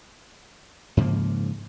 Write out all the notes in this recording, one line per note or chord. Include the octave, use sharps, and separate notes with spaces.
G#2 C#3 F3 A#3